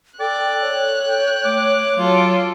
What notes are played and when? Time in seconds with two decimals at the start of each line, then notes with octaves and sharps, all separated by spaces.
0.20 A4 D5 G5 F#6
0.62 C#5
1.08 G5
1.45 A3 D6
1.96 F#3 F4 A4